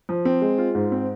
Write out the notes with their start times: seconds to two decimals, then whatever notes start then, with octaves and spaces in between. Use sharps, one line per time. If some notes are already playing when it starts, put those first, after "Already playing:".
0.09 F3
0.25 C4
0.42 G#3
0.58 F4
0.75 G#2
0.92 C4